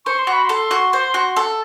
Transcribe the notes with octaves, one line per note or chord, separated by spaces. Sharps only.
C5 C#6
C6
F#4
B5
A4 C6
F#4
C5
F#4
A4